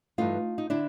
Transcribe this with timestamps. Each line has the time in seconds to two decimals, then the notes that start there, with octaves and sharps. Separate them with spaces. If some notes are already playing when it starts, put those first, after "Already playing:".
0.18 G2 E3 A3 D#4 F4
0.58 D#4
0.70 D3 D4 E4